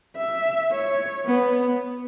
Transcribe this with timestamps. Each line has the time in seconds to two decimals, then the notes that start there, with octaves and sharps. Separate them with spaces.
0.17 E5
0.72 C#5
1.26 B3